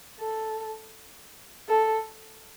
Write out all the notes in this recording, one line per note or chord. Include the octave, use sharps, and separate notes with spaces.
A4
A4